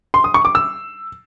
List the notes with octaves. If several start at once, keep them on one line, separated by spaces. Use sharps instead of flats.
C6
D#6
C#6
D6
E6